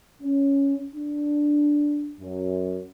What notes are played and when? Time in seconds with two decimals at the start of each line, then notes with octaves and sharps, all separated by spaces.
0.22 C#4
0.94 D4
2.20 F#2